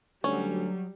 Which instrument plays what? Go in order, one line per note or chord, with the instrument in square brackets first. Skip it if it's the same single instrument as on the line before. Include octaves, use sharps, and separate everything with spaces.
[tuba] D2 [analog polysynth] F#3 [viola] G3 [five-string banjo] C#4